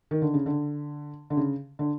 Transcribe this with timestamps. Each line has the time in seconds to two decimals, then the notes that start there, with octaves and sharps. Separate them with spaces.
0.11 D#3
0.22 D3
0.34 C#3
0.46 D3
1.30 D3
1.37 C#3
1.79 D3